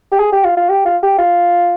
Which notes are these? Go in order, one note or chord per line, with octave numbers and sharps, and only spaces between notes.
G4
G#4
G4
F4
F4
G4
F4
G4
F4